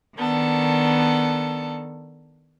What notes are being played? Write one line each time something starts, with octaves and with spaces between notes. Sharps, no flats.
D#3 B3 D4 A4